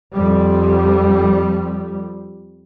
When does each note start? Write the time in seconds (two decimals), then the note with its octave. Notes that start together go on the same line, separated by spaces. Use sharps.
0.14 F2 G3